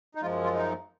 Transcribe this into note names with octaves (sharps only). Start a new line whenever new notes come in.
D#4
F#2 F3 G#3 F4
F4
D#4